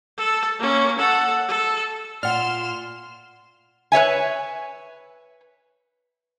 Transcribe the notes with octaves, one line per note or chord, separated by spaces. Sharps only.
A4
A#3 C#4
A4 F#5
A4
A#2 D5 F#5 C6 F6 E7
B4 C#5 E5 G#5